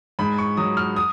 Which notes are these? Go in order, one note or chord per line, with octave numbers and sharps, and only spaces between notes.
G#2 B5
C#6
F#3 D#6
F6
D#6